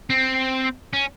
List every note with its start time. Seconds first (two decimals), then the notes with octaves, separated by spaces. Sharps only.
0.10 C4
0.93 C#4